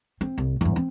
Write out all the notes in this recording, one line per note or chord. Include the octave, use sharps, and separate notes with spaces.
C4
C2
E2 G2
C4